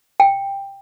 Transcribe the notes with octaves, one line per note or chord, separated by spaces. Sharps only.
G5